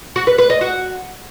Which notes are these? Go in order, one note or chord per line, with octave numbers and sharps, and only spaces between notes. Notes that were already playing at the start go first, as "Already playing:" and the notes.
F#4
B4
B4
D#5
F#4